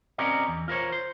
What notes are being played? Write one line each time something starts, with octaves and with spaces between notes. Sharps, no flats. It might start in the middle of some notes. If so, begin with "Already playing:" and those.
C4 C#4 F#4 A#4 D5 D#5
E2
F4 A#4 C5 C#5
C5